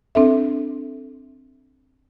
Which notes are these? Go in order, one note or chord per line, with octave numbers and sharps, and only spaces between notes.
C4 D4 A4 E5